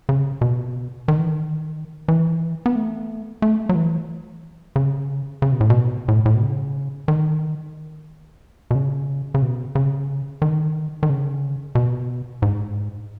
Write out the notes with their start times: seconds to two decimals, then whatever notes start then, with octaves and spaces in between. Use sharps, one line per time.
0.09 C#3
0.41 B2
1.08 D#3
1.18 E3
1.28 D#3
2.08 E3
2.66 B3
2.76 A3
3.42 A3
3.69 F#3
3.75 E3
4.76 C#3
5.42 C#3
5.52 B2
5.61 A2
5.70 B2
6.08 A2
6.26 A2
6.35 B2
6.42 C#3
7.08 D#3
8.71 B2
8.75 C#3
9.34 C#3
9.42 B2
9.75 C#3
10.42 D#3
11.03 D#3
11.09 C#3
11.75 B2
12.42 G#2